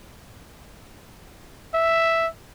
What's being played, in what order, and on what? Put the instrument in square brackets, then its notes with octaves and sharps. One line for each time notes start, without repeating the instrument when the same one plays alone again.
[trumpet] E5